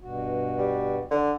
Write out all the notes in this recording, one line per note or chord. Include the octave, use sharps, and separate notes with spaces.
G2 B2 F#4
G3
D3